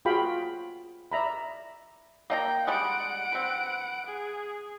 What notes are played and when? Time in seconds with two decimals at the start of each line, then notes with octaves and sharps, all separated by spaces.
0.05 F4 F#4 G#4 F5 G5 B5
1.12 D5 E5 A#5 B5
2.30 A#3 D#5 G5 A#5
2.67 G3 G#3 F#5 D7
3.32 C4 B4
4.06 G#4